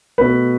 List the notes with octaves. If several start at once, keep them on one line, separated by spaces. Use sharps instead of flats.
B2 A3 B4